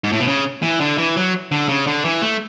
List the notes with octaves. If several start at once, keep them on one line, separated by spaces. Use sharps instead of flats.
G#2
A2
B2
C#3
E3
D3
E3
F#3
D3
C#3
D3
E3
A3